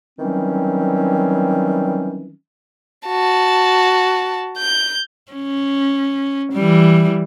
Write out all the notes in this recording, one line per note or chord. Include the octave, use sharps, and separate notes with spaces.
D#3 E3 F#3 G3 C4 C#4
F#4 A5
G6
C#4
E3 G3